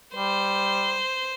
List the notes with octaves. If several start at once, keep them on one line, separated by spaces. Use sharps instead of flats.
G3 C5